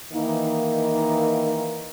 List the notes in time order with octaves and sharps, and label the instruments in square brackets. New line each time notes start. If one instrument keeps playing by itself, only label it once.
[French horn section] D#3 E3 A#3 D#4